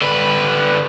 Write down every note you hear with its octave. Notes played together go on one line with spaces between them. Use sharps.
D3 B4